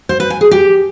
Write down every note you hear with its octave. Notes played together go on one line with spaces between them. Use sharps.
C5
B4
G#5
G#4
G4